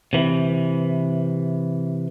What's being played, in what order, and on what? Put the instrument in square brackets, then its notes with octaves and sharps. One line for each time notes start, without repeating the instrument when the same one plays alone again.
[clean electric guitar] C3 E3